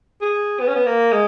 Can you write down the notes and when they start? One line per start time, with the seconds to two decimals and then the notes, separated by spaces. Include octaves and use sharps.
0.21 G#4
0.60 B3
0.67 C#4
0.75 B3
0.86 A#3
1.12 G#3